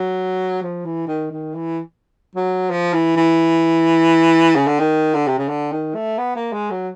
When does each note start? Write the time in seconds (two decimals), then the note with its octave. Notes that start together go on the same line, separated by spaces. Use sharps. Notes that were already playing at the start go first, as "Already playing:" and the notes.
Already playing: F#3
0.62 F3
0.85 E3
1.08 D#3
1.31 D#3
1.55 E3
2.35 F#3
2.71 F3
2.94 E3
3.17 E3
4.55 C#3
4.67 D3
4.80 D#3
5.14 D3
5.28 C3
5.38 C#3
5.48 D3
5.72 D#3
5.95 A3
6.18 B3
6.36 A#3
6.53 G#3
6.71 F#3